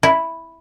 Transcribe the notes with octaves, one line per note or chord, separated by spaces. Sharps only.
E4